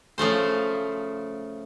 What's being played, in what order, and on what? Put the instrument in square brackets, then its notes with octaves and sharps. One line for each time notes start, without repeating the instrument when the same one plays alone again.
[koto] C#3 F3 A3 C5